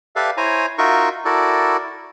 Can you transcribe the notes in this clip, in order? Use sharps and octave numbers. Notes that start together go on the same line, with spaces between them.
G4 A4 B4 D5 E5 F5
E4 C5 C#5 G#5 A#5
D#4 F4 F#4 A#4 E5 C#6
E4 F#4 A4 A#4 D5